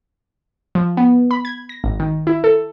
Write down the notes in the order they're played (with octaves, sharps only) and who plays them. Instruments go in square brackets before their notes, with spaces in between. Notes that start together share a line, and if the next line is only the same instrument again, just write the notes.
[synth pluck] F3
B3
B5
G#6
A#6
G#1
D#3
E4
A4